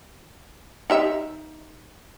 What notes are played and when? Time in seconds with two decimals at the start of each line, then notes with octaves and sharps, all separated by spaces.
0.90 D#4 G4 E5